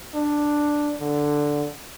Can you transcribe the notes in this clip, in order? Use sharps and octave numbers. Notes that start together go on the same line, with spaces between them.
D4
D3